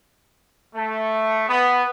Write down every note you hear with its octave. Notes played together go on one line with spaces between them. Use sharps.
A3
B3